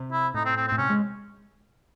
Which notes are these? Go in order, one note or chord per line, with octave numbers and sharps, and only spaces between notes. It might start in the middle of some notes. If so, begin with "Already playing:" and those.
Already playing: C3
E4
A2 D#4
C4
C4
C4
A2
C3 C#4
G#3